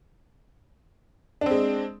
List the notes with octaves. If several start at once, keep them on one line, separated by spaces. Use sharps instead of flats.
G#3 C4 D4